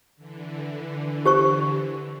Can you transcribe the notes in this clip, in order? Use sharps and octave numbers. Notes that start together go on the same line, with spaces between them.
D3 E3
G4 C5 C#6